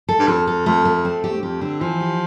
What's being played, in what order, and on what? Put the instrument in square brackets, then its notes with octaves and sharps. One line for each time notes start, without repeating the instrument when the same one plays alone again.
[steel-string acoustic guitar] A4
[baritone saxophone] G2
[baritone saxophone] F2 [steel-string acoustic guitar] A4
[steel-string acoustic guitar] A4
[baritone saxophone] F2 [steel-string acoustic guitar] A3
[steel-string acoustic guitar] A3
C4
[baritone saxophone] E2 [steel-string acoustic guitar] G4
[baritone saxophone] G2
[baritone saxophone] F2 [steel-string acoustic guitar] G4
[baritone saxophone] D3 [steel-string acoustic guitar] C4
[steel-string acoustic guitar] E3 [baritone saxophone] F3
[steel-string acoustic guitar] G4